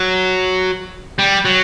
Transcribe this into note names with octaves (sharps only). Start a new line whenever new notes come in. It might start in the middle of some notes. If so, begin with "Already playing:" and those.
Already playing: F#3
G3
F#3